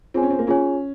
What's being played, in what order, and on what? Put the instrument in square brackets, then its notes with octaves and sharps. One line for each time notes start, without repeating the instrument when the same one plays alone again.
[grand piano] C4 [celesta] F4 G#4 C#5 G#5
[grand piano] C#4
C4
A#3
[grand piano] C#4 [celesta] F4 G#4 C#5 G#5